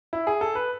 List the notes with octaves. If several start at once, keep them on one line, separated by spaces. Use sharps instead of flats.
E4
G#4
A4
B4